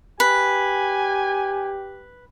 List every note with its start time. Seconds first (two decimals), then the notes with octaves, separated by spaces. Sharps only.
0.20 G4 B4 G#5